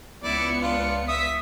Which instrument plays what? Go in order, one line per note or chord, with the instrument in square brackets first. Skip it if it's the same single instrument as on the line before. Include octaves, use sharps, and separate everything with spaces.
[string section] C#2 B3 C#7 [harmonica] E4 D5
[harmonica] D4 F4
[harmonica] E5 D#6 [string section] B6